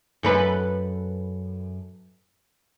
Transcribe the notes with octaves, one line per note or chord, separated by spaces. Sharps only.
F#2 A4 B4